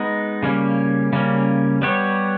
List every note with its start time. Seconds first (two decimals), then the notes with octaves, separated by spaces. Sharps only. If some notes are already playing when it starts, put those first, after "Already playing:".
Already playing: G#3 B3 D#4
0.43 C#3 G3 A#3 C#4
1.13 C#3 G3 A#3 C#4
1.82 G3 B3 G4 C#5